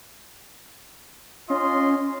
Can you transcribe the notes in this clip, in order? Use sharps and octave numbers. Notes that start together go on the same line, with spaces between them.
C#4 F4 D#5 C6